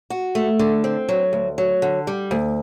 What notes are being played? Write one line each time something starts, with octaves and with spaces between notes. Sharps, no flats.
F#4
A3
D3
C4
F#3
D2
F#3
D3
G3
D2